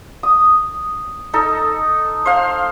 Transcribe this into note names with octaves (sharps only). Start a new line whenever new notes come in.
D#6
D#4 A4
C5 F5